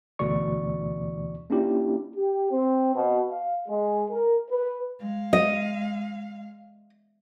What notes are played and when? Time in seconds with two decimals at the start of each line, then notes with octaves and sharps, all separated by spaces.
0.19 D2 B2 E3 D5 C#6
1.50 A#3 C#4 D4 E4 F4 G4
2.15 G4
2.51 C4
2.94 B2
3.31 F5
3.68 G#3
4.10 A#4
4.49 B4
4.99 G#3 F5
5.33 D#5